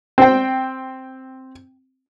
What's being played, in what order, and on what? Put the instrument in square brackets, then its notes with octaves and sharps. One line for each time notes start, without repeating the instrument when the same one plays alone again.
[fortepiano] C4 G5